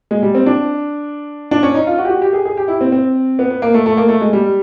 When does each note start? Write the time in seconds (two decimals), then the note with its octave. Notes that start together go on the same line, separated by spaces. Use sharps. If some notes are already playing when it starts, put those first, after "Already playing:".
0.11 G#3
0.22 G3
0.35 C4
0.46 D4
1.51 D4
1.63 C#4
1.74 D#4
1.87 F4
1.98 F#4
2.05 G4
2.10 F#4
2.22 G4
2.33 G#4
2.46 G#4
2.57 G4
2.68 E4
2.81 C4
2.92 C4
3.39 B3
3.50 B3
3.62 A#3
3.74 A3
3.86 A3
3.97 A#3
4.09 A3
4.21 G#3
4.33 G3